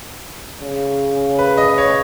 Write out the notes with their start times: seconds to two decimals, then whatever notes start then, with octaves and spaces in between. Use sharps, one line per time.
0.62 C#3
1.39 B4
1.57 D#5
1.78 C#5